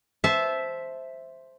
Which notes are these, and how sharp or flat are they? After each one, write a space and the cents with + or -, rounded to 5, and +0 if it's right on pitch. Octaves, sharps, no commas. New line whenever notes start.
C5 +0 E5 +0 A5 -20